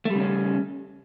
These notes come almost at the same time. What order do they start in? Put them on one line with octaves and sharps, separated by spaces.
A3 G3 C#3 C#4